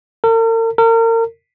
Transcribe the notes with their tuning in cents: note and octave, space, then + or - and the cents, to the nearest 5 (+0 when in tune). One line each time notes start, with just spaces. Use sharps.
A#4 -45
A#4 -35